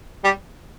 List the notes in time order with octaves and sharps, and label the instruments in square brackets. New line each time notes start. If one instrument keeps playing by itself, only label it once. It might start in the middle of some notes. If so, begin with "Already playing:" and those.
[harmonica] G3 G4